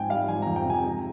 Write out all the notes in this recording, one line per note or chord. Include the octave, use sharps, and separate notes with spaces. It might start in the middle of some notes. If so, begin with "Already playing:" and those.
Already playing: G#2 F3 C4 G5 G#5
G3 F5
F3 G#5
F2 A#5
G5
C3 G#5
G#3